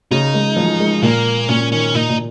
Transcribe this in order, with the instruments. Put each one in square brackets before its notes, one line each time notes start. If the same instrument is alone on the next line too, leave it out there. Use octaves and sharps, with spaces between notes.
[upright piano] C#3 [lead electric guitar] D#4
[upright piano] G#3
F3
G#3
[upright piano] A#2 [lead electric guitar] A#3
[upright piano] A#2 [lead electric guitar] C#4
[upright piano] D#3 [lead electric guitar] C#4
[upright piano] A#2 [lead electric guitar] D#4
[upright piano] A#2